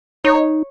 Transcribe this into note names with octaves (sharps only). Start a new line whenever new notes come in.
D#4 C#5